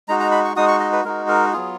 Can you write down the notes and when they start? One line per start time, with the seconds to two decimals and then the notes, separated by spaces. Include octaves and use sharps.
0.08 G#3 D#4 F#4 A#5
0.20 A#5
0.31 B5
0.45 C#6
0.56 G#3 D#4 F#4 D#6
0.68 C#6
0.80 D#5
0.93 B4
1.05 G#3 D#4 F#4 A#4
1.29 A#4
1.53 F#3 B3 F4 G#4